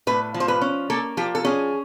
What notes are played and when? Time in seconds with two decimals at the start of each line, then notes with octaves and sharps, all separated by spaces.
0.07 A2 B4
0.34 F3
0.40 C5
0.48 B4
0.61 C#4
0.90 A#3 A4
1.17 F3 G4
1.35 A4
1.45 C#4 G#4